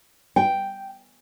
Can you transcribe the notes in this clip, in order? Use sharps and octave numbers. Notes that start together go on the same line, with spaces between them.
G5